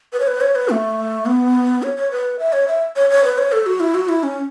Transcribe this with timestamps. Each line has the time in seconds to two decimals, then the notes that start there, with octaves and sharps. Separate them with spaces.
0.13 B4
0.20 C#5
0.27 B4
0.41 C#5
0.55 B4
0.70 A3
1.26 B3
1.83 C#5
1.97 C#5
2.11 B4
2.39 E5
2.53 C#5
2.68 E5
2.96 C#5
3.10 C#5
3.24 B4
3.38 C#5
3.52 A4
3.66 F#4
3.80 E4
3.95 F#4
4.09 E4
4.23 C#4